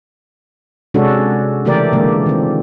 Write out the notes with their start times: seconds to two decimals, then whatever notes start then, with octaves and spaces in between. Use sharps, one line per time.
0.94 C3 G#3 C#4 D4 F#4 A4
1.65 C#3 E3 A3 G4 A#4 D5
1.93 A#2 D3 E3 G#3 A#3
2.26 D#3 C4